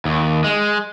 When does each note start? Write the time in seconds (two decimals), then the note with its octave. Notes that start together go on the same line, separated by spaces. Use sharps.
0.05 D#2
0.44 G#3